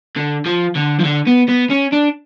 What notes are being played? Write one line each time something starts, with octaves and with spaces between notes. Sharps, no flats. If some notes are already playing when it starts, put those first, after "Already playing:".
D3
F3
D3
F3
D3
B3
B3
C#4
D4